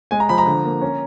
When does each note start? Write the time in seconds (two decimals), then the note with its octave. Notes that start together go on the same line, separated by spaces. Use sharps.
0.11 G#3 G#5
0.20 A#5
0.29 F3 B5
0.38 A#5
0.46 D3
0.65 A#3
0.81 C#4